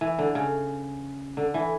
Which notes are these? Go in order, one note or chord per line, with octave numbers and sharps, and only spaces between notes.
E3
D3
C#3
D3
E3